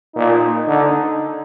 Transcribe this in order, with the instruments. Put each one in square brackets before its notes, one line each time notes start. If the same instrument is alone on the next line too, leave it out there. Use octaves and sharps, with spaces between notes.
[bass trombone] A#2 [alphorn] D#4
[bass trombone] D3 [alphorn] D#4